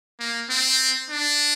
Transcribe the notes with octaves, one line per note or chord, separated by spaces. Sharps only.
A#3
C4
D4